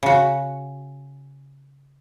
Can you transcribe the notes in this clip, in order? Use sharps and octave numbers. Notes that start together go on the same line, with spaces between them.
C#3 F#4